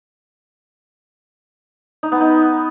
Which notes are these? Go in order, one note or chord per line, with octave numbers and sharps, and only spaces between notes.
D#4
B3
D#4